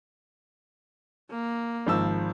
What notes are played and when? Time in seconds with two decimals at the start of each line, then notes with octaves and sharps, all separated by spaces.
1.31 A#3
1.86 G#1 F3 E6